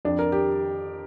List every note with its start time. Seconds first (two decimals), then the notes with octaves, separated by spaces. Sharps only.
0.05 F2 D4
0.19 A#4
0.32 G4